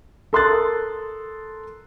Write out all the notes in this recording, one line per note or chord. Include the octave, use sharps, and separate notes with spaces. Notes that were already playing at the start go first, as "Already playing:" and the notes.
A4 A#4 C6 D#6 F#6 A6